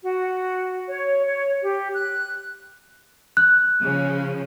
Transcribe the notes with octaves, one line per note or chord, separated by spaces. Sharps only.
F#4
C#5
C#5
G4
F#6
F#6
C#3 F3